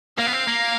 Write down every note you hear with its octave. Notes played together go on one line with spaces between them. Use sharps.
A#3 F5
B3
C4
A#3